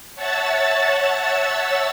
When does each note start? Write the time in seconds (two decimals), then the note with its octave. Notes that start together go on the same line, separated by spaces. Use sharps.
0.15 C#5 E5 F#5 A5 E6 A6